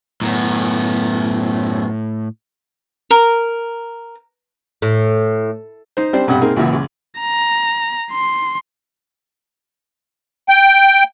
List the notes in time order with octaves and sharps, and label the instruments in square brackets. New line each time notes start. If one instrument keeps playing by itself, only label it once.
[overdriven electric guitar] F#2 B3 [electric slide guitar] A2
[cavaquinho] A#4
[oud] A2
[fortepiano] D#4 C5
G3 C4 D4 C5
B1 G2 C3 G3 F#5 G5
A#3 C4 D#4 G#4
C#2 F#2 A#2 E3
C#2
[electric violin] A#5
C6
[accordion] G5